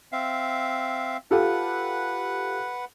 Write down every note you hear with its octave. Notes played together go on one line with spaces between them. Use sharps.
C4 E5 F5
F4 G4 A4 B4 F#5